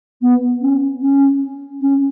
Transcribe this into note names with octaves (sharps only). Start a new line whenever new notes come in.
B3
C#4
C#4
C#4